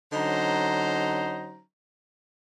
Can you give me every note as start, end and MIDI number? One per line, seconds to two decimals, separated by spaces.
0.13 1.60 50
0.13 1.60 54
0.13 1.60 61
0.13 1.60 63
0.13 1.60 72
0.13 1.60 82